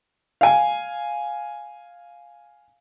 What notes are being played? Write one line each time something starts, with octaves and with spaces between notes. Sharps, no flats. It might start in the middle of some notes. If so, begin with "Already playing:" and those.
F5 G#5